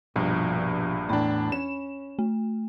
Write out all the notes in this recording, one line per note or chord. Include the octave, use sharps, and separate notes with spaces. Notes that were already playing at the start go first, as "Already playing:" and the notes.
A#1 G2 B2 F3
E2 A2 D4 B5
C#4 E7
A3